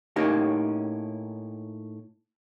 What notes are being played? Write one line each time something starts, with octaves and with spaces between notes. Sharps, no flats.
A2 A#3 C#4 D#4 G4